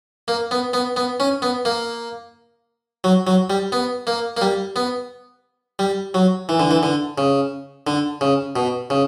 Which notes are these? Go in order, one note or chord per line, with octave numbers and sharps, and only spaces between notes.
A#3
B3
B3
B3
C#4
B3
A#3
F#3
F#3
G3
B3
A#3
A#3
G3
B3
G3
F#3
E3
D3
E3
D3
C#3
D3
C#3
B2
C#3